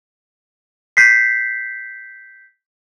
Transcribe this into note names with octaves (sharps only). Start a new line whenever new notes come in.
G6 B6 C7